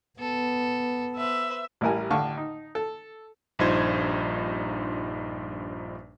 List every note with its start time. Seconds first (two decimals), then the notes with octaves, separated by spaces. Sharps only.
0.19 B3 A4
1.16 B4 C5 E5
1.81 A1 G3 E4 A#4 G#5
2.10 A1 A2 D3 F5 C#6
2.37 D#4
2.75 A4
3.59 A#1 G2 D#4 F4 C5 G#6